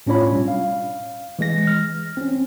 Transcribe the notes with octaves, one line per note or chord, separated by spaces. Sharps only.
A2 C#4 D4 F4 C#5 B5
B2 G3 C#4
F5
E3 G#3 A#6
F6
C4 C#4